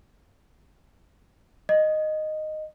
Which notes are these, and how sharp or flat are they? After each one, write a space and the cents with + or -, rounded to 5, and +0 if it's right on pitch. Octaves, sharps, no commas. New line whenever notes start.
D#5 -10